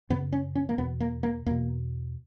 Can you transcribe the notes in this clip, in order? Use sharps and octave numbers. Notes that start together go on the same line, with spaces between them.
F#2 C#3 B3
C#4
C#4
A#3
E2 B2 B3
A#3
A#3
E2 B2 A#3